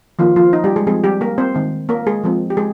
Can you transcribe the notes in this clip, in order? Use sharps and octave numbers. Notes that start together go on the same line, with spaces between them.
D#3 F3 A#3 F4
F3 F4
D#4
G3 G4
G#3 G#4
F3 G#3 C4 G#4
G3 G4
A#3 A#4
C4 C5
D#3 G#3 C4
A#3 A#4
G#3 G#4
F3 G#3 C4
G4
G#3 G#4